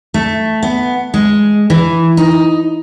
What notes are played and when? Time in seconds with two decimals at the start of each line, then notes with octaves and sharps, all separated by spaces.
0.14 A3
0.63 B3
1.14 G#3
1.70 E3
2.17 D#4